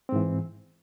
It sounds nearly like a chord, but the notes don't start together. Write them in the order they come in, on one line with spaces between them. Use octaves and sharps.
C4 G#2 E3